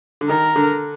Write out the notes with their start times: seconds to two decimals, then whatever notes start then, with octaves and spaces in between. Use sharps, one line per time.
0.21 D3
0.28 D#3 A#4
0.56 D3